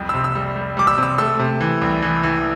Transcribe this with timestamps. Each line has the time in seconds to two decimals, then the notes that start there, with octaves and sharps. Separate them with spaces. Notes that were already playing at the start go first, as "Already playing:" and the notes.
Already playing: C2 F2
0.09 E6
0.14 C3
0.24 E6
0.35 G3
0.56 G3
0.77 G3 D6
0.87 E6
0.98 C3 E6
1.18 A3 E6
1.39 C3
1.61 E3
1.81 C2
2.02 E3
2.23 E3